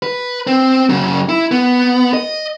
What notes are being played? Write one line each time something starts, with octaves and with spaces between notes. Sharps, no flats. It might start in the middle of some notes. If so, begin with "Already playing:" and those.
B4
C4
F#2 C#3
E4
B3
D#5